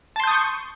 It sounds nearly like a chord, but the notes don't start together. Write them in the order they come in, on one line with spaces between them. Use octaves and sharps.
A5 C6 G6 D#6 C#6